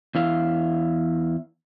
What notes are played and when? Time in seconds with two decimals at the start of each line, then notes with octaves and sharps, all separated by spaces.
0.15 E2 E4 F5